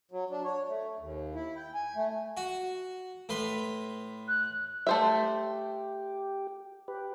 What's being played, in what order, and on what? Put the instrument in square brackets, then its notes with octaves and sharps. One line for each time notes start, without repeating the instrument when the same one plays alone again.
[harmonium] F#3
D4
C#5
A3
D#2
E4
G5
G#5
A3
[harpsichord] F#4
A2 B4 C6
[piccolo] F#6
[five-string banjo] A3 C5 E5 [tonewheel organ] G4
[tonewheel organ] G4 B4